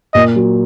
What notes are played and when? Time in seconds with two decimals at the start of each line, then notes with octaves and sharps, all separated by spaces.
0.14 A#2 D#5
0.35 F#3